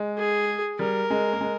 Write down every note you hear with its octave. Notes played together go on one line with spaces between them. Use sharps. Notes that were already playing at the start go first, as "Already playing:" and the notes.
Already playing: G#3
G#4
G3 A#4
G#3
A#3
G#3